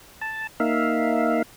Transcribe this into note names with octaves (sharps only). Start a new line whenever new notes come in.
A5
A#3 D#4 E5 F5